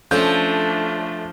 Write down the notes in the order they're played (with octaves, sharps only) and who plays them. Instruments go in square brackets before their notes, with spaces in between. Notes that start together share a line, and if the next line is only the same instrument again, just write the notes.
[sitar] F3 [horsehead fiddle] A3 D4 [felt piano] C#4 G6 [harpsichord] A4 D5